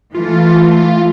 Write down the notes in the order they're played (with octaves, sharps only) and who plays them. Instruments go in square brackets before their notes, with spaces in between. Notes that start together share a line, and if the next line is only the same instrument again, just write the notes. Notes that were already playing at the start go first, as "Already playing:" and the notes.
[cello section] E3 A3 [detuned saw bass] F4